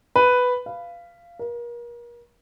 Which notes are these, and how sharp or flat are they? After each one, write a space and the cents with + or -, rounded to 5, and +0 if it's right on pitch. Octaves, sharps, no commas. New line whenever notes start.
B4 +5
F5 -15
A#4 +35